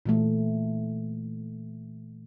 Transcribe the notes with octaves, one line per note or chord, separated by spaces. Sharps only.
A#2 E3 A3